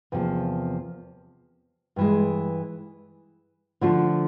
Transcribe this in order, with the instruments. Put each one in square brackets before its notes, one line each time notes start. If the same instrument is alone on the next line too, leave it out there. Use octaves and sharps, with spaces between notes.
[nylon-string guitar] E2 C3 F3 A#3
G2 E3 G#3
D3 F3 A3 D4 F4